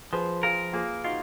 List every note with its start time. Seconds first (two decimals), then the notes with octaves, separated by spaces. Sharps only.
0.13 F3 G#4 B4
0.43 F4 G#4 A#4
0.73 A#3 F4 G#4
1.04 D#4 F4 F#4